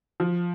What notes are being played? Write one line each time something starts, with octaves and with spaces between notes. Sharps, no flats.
F3